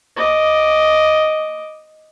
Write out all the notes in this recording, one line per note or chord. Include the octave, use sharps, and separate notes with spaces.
D#5 D6